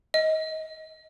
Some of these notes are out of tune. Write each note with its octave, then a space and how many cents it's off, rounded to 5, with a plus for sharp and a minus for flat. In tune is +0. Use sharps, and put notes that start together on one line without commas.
D#5 +25